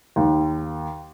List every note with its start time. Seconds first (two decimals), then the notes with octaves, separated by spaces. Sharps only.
0.16 D#2